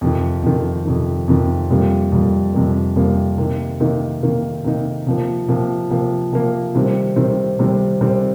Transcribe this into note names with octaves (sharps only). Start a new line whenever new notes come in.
F2 C3 D#3
F2 C3 D#3
F2 C3 D#3
F2 C3 D#3
F2 C3 G3 A#3
F2 C3 G3 A#3
F2 C3 G3 A#3
F2 C3 G3 A#3
C3 D#3 A#3 D#4
C3 D#3 A#3 D#4
C3 D#3 A#3 D#4
C3 D#3 A#3 D#4
C3 F3 A#3
C3 F3 A#3
C3 F3 A#3
C3 F3 A#3
C3 D#3 G3 C4
C3 D#3 G3 C4
C3 D#3 G3 C4
C3 D#3 G3 C4